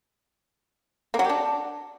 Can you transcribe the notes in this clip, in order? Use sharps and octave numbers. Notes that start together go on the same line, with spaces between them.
A#3
F#3
G4
D4